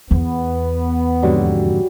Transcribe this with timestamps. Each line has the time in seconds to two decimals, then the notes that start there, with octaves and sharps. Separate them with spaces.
0.11 E2 B3
1.23 F2 G#2 D3 F#3 G3